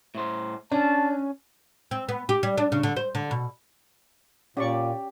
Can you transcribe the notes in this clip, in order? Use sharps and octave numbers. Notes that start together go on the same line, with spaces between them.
A2 C5
C#4 D4 A5
C4
B3
G4
G3
D4
C#3
D3
C5
D3
B2
A#2 C#4 G4 D5 C#6